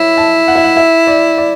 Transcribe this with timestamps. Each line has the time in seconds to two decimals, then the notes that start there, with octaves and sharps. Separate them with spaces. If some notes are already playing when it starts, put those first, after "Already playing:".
Already playing: E4 C#5 B5
0.18 A5
0.48 F#5
0.55 E5
0.64 F#5
0.77 E5
1.07 D5
1.38 D5